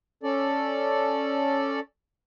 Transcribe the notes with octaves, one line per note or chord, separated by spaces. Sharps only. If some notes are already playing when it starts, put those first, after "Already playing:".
C#4 A4 D5